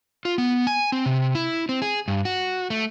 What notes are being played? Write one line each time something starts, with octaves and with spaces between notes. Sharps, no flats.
F4
B3
G#5
C4
C3
E4
C4
G#4
G2
F#4
A3